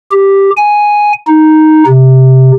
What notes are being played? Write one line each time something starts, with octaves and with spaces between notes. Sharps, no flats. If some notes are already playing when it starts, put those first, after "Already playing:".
G4
G#5
D#4
C3